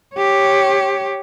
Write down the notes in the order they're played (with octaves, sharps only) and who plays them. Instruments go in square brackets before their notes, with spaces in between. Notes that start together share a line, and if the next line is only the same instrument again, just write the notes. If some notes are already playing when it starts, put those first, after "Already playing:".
[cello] G4 C#5